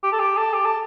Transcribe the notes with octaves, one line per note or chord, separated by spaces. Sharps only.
G4
A4
G4
A4
G4
A4